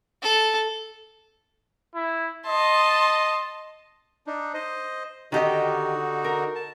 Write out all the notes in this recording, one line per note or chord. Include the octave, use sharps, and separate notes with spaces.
A4
E4
D#5 A5 C6
D4 D#4
C5 D#5
D3 D#3 D#4 F#4 G4 D#5
A#4
A5